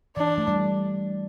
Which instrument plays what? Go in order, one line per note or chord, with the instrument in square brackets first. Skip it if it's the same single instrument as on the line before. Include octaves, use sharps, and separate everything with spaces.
[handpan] E3 [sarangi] D4
[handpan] A3
G3